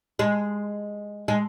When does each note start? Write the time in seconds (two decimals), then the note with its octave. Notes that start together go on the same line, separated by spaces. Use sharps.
0.19 G#3
1.28 G#3